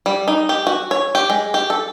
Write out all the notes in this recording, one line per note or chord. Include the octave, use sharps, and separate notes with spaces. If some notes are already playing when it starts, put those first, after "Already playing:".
G3
D#4
G4
F#4
C#5
G4
G#3
G4
A4